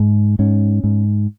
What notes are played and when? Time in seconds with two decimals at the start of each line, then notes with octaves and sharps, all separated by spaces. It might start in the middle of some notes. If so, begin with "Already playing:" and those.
Already playing: G#2
0.39 G#2 C#4
0.84 G#2